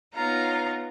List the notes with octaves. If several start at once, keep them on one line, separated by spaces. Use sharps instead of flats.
B3 D#4 F4 C#5 A#5